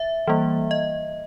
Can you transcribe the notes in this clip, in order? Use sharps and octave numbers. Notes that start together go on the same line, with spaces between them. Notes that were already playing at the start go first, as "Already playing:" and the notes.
Already playing: E5
E3 G3 A#3
D#5